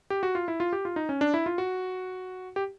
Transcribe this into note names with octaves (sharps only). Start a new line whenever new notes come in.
G4
F#4
F4
E4
F4
G4
F4
D#4
C#4
D4
E4
F4
F#4
G4